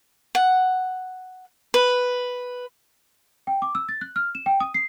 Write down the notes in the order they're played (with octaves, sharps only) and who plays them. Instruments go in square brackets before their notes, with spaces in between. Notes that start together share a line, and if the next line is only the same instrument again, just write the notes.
[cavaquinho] F#5
B4
[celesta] G5
D6
E6
A6
F#6
F6
E7
G5
D#6
C7